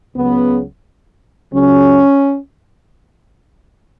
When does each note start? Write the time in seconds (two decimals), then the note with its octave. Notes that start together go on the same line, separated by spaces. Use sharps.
0.15 C#2 C#3 F#3 B3
1.53 C#2 C#3 F#3 C#4